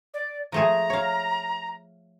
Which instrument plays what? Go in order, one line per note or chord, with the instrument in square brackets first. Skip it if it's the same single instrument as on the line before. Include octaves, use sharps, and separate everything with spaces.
[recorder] D5
[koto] F3 A3 G#4 [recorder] A#5
[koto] C#5 F5